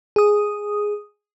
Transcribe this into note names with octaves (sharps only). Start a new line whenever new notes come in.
G#4 D#6